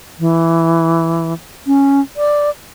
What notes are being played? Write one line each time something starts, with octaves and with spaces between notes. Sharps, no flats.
E3
C#4
D5